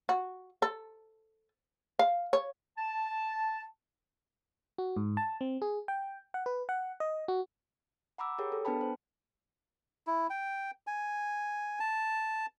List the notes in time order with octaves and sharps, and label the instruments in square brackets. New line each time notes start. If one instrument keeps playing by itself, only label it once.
[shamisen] F#4
A4
F5
C#5
[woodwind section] A5
[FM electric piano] F#4
G#2
A5
C4
G#4
G5
F#5
B4
F#5
D#5
F#4
[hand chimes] F#5 A#5 B5 D6 E6
G4 G#4 A#4 C#5 G5
A4
B3 D4 B4 G5 A5 B5
C5
[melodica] E4
G5
G#5
A5